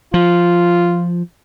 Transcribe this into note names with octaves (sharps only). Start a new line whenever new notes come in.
F3 F4